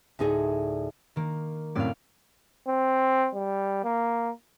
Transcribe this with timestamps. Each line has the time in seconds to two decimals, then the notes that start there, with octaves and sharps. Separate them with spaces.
0.19 D2 A2 D#4 G#4 D5
1.16 D#3 A#3
1.75 F#2 A2 C3 D5 F5
2.68 C4
3.35 G3
3.84 A#3